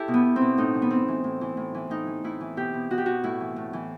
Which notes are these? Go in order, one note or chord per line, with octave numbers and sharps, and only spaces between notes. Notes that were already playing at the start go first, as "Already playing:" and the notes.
Already playing: E4 G4 A4
B2
B3
B2
C4
B2
A2 D#4
E3
B3
A2 C4
E3
A2
E3
A2
E3
A2 D#4
E3
A2 E4
E3
B2 G4
B2
B2 F#4
G4
B2 F#4
A2 E4
E3
A2
E3